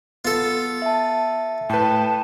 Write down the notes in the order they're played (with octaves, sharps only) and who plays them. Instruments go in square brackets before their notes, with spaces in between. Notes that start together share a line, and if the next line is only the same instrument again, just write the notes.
[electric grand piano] B3 [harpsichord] F4 A4
[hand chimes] E5 A5
[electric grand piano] A2 B4 [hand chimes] G5 G6 [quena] A5